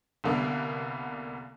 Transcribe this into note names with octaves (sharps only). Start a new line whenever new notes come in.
C2 D3 A#3 B3